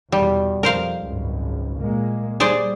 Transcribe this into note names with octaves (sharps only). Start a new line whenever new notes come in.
E2 B2 G3
F2 A#4 C5 F5
G#1 C#2 F#2
A#2 G#3 A#3
G3 G#4 C5 D5